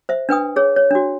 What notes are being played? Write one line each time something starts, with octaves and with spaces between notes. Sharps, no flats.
C5 E5
D4 B4 G5 D#6
G#4 C#5
C#5
D4 F#4